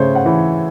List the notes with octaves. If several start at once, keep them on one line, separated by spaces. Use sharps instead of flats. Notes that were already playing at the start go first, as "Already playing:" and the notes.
Already playing: C#3 A3 C5 C#5
F#5
E3